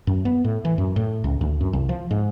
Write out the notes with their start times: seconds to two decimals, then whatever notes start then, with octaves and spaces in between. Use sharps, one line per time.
0.07 F#2
0.25 B3
0.44 A2
0.65 E3
0.78 F#2
0.96 A2
1.24 C#2
1.41 D2
1.61 F#2
1.73 C2
1.89 F3
2.11 G#2